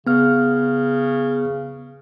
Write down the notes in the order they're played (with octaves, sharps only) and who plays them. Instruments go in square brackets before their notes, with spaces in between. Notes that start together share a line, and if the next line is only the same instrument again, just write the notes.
[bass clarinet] C#3 [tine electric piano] B3 F6